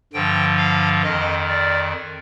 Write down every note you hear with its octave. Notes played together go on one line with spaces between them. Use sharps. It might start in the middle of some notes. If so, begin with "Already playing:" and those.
G2 D3 F3 G5
F5
F2 D#3 D#5
D5